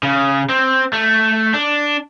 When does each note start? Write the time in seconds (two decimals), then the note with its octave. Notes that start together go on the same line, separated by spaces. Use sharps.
0.03 C#3
0.49 C4
0.93 A3
1.54 D4